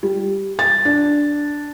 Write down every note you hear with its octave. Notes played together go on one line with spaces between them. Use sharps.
G3
A6
D4